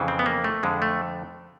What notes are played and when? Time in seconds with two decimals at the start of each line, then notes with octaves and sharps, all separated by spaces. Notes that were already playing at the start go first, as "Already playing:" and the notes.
Already playing: F2 C#3 E3
0.08 C4
0.19 B3
0.26 A#3
0.44 A3
0.63 F2 D3 G#3
0.82 A3